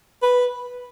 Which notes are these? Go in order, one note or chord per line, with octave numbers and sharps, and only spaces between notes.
B4